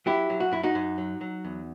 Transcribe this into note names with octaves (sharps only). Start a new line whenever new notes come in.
F#3 E4 G4
F#3
F#4
F#2 E4
D#4 F#4
F#2
F#3
F#3
E2